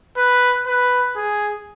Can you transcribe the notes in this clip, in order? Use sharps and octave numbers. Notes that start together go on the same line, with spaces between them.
B4
B4
G#4